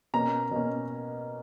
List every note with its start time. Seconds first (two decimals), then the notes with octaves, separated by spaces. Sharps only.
0.14 B2 A#3 C#4 A#5
0.51 B2 A#3 C#4